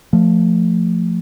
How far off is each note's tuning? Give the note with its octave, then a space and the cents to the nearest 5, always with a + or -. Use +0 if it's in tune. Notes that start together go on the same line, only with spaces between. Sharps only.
F3 +0 A3 +15